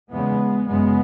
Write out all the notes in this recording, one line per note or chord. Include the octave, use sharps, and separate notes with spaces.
E2 C#3 G#3 B3
F#2 C#3 G#3 B3